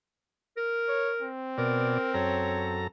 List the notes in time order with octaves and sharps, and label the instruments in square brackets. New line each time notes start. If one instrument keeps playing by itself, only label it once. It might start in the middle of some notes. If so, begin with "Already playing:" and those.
[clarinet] A#4
[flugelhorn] C#5
C4
[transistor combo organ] B2 D5 [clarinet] A#4
[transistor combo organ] F#2 A4 A#5 [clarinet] C#5